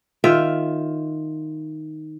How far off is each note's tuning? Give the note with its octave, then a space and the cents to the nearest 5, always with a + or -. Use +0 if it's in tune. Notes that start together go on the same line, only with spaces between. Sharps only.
D#3 +0 F4 +5 E5 +5